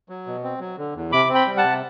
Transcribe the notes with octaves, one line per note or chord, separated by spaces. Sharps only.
F#3
B2
C4
F#3
D3
E2
C3 B5 D6
C4
G5 B5
G3
F#5 A5
C3